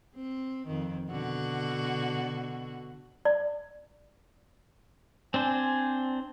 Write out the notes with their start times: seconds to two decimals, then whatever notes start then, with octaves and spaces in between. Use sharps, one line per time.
0.15 C4
0.67 F2 D#3
1.09 B2 D3 F#4
3.25 D5
5.34 C4 D4 C5 G#5